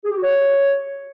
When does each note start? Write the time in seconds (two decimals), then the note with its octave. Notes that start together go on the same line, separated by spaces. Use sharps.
0.05 G#4
0.11 G4
0.17 F#4
0.23 C#5